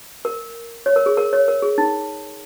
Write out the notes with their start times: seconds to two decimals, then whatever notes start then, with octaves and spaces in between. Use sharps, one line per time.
0.25 A#4
0.86 C#5
0.96 A#4
1.06 G#4
1.17 A#4
1.33 C#5
1.48 A#4
1.62 G#4
1.78 D#4